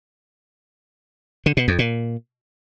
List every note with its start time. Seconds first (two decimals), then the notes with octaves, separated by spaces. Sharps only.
1.46 D3
1.57 B2
1.68 F2
1.79 A#2